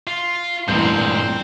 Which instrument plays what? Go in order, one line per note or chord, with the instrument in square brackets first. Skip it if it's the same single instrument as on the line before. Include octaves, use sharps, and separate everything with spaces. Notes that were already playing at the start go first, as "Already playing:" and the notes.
[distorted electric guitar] F4
[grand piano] A1 G6 [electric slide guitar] G2 A#2 G#3 [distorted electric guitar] C4 C5